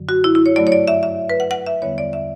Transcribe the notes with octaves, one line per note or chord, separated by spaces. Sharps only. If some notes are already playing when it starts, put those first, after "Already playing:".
Already playing: F#2 D3 F#3
F#4
E4
E4
C#5
G2 F#3 A3 D5
C#5
D5
E5
E5
B4
F#5
F#5
E5
E2 D3 G3 B3 C#5
D5
E5